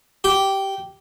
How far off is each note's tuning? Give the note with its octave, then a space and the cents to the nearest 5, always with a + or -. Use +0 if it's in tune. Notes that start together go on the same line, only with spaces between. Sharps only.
G4 -10